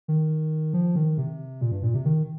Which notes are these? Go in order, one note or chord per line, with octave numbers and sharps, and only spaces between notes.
D#3
F3
D#3
C3
A#2
G2
A#2
C3
D#3